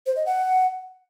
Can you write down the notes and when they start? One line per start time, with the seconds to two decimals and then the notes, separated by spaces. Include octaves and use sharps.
0.06 C5
0.16 D#5
0.26 F#5